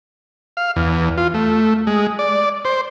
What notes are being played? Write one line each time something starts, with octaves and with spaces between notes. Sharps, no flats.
F5
E2
F4
A3
G#3
D5
C5